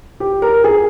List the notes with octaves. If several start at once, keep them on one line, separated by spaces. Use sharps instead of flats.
G4
A#4
G#4